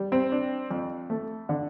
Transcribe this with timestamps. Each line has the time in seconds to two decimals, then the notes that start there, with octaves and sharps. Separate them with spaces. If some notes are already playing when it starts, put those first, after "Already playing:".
Already playing: G3
0.12 C4
0.32 D4
0.71 F2
1.10 A3
1.49 D3